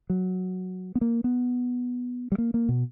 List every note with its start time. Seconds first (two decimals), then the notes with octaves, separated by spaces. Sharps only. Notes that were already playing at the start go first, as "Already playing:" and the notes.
0.10 F#3
0.95 B3
1.01 A#3
1.24 B3
2.32 G3
2.38 A#3
2.54 A#3
2.69 B2